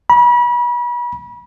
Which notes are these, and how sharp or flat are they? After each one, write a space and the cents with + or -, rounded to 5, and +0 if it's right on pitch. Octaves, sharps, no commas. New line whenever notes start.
B5 -35